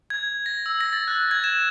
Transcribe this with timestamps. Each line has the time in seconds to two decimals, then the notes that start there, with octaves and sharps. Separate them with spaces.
0.10 G#6
0.46 A#6
0.66 E6
0.81 A#6
0.93 A6
1.08 F#6
1.31 G#6
1.44 E7